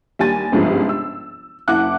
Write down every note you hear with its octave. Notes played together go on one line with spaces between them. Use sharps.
D#2 G3 G#5 A6
G1 C#2 G#2 C3 F3
E6
F#1 E4 F#5 D6 F#6